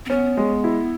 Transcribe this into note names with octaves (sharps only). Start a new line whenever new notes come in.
C4
B3 C#4
G#3
E4